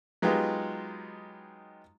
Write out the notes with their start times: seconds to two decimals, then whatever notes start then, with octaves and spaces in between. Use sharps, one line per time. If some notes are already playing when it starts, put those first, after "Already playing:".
0.22 F#3 G#3 B3 D#4 F4 G4